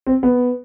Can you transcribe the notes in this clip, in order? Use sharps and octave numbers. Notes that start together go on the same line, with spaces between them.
C4
B3